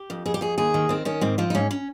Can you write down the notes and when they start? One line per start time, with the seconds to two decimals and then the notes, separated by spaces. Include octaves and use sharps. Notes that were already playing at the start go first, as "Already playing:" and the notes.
Already playing: G4
0.10 F2
0.26 F2 G#4
0.34 G4
0.41 F2 G#4
0.58 D#2 G#4
0.74 D#3
0.89 D#3 C4
1.05 D#3 C#4
1.21 G#2 C4
1.38 F3 C4
1.50 D#4
1.55 G#2 C#4
1.71 C#4